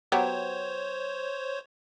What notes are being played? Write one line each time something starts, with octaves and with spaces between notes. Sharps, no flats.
F#3 B3 G4 C5 C#5